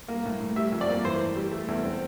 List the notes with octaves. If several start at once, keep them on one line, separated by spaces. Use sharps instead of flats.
A#3
A2
A2
G3 E5
F2
D5
A#3
E3 C5
A1
G3
A3
E2
C4